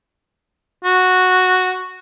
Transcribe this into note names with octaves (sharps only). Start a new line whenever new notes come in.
F#4